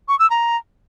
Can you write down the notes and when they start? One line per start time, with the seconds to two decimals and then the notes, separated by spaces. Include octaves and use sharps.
0.08 C#6
0.19 E6
0.30 A#5